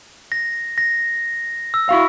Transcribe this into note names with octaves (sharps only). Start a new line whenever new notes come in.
A#6
A#6
E6
E4 F#4 F5